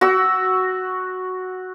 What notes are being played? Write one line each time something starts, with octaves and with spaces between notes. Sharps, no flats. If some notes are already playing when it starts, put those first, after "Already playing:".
F#4 E6